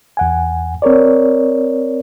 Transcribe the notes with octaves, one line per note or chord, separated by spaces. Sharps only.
E2 F#5 G#5
C4 A#4 C#5 D5